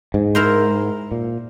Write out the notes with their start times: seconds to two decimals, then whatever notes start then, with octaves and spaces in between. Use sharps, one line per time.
0.14 G#2
0.35 E4 A#4 C5
1.11 A#2